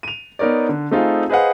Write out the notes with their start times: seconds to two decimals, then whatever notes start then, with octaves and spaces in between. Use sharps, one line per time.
0.03 D#7 F7
0.39 B3 D#4 A#4 C#5 D5
0.69 D3
0.91 A3 C4 D#4 F4 G#4 A4
1.30 G#4 B4 C5 D#5 F5 F#5